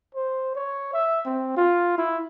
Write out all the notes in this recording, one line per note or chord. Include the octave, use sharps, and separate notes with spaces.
C5
C#5
E5
C4
F4
E4